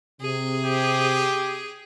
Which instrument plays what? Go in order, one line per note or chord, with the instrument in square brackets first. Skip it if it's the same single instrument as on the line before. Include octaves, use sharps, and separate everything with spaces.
[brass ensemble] C3 [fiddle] G#4
[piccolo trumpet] G4